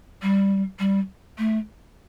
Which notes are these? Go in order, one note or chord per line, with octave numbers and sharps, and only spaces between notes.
G3
G3
A3